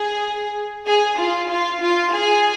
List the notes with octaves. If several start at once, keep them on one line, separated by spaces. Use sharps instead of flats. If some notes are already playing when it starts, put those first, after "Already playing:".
Already playing: G#4
G#4
F4
F4
F4
G#4